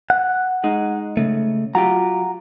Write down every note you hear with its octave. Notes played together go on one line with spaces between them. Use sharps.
F#5
G#3 D#4
C#3 A3
F#3 F4 G4 F#5 A#5